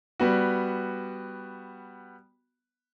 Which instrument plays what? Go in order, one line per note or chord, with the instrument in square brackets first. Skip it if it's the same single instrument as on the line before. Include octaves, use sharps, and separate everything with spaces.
[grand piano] G3 B3 F#4